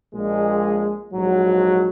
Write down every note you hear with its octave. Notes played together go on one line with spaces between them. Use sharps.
A#1 A#2 G#3
A#1 G#2 F#3